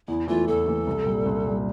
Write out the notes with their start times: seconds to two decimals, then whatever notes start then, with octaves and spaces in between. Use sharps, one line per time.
0.08 E2 E4
0.28 E3 A3 E4 F4
0.48 E2 A4
0.67 E3 A3 E4
0.87 C2
1.06 A#2 G3
1.26 C2
1.46 A#2 G3